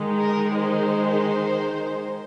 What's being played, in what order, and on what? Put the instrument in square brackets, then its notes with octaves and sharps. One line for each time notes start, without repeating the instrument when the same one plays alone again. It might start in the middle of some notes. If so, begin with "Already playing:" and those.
Already playing: [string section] D#3 G#3 D#4
A#4
C5